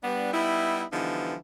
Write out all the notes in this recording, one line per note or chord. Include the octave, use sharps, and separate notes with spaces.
G3 B3 D4
G3 B3 D#4 E4
D3 E3 F3 G3 B3 D#4